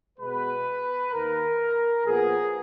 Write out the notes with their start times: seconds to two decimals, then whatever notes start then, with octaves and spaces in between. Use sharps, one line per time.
0.19 B2 G#3 B3 B4
1.12 D#2 D#3 A#3 A#4
2.05 A#2 F3 B3 G#4